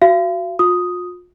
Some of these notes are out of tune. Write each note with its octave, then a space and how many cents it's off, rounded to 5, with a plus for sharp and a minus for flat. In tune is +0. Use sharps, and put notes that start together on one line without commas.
F#4 +0 F5 -40
F4 +40 D#6 +0